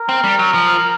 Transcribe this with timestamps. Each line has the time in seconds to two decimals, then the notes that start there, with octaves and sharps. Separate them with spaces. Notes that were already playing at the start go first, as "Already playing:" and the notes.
Already playing: A#4
0.09 C4
0.24 G3
0.39 F#3
0.54 F3